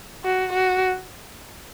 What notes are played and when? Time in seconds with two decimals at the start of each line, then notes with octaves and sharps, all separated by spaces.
0.25 F#4
0.53 F#4